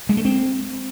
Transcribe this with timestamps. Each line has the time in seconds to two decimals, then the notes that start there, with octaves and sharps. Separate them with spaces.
0.09 G#3
0.17 A3
0.25 C4